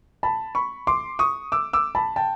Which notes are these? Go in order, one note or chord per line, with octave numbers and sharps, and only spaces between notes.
A5 B5
B5 C#6
C6 D6
C#6 D#6
D6 E6
D6 E6
A5 B5
G5 A5